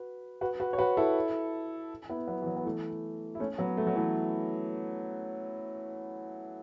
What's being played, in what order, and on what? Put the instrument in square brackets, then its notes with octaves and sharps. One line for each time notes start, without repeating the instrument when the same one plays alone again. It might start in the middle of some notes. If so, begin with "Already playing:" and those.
Already playing: [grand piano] F#4 B4
F#4 B4
F#4 B4
C#5
F#4 B4
E4 A4
B3 E4
F#3 B3
E3
F#3
B3
E3 A3
E4
A3 C#4
F#3 B3
A3
F#3
E3 A3